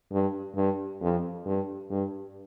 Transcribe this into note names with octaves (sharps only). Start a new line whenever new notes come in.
G2
G2
F2
G2
G2